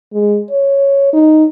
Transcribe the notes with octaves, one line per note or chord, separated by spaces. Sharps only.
G#3
C#5
D#4